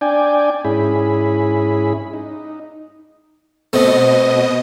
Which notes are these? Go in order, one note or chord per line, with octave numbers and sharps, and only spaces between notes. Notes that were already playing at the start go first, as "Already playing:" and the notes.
D4 D5 G5 G#5
G#2 C#4 E4 G#4 B5
D#4
B2 A3 C4 D#5